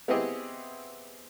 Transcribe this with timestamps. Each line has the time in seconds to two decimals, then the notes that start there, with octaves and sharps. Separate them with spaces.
0.08 B3 C4 E4 G4 G#4 D#5